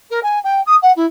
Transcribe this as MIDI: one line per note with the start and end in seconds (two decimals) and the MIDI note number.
0.10 0.19 70
0.23 0.39 80
0.44 0.60 79
0.66 0.76 87
0.82 0.92 78
0.96 1.05 64